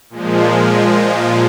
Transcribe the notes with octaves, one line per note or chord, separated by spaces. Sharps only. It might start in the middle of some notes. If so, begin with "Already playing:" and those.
A#2 F3 G#3